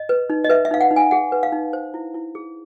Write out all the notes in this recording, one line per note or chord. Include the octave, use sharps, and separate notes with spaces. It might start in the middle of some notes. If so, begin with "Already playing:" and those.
Already playing: D#5
B4
D#4
D#5
B4 E5
E5
D#4 F5
F#5
D#4
G#5
G#4 F#5
B4
F5
D#4
C5
E4
E4
G#4